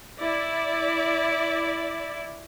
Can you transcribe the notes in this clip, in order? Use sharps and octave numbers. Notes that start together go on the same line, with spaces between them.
E4 D5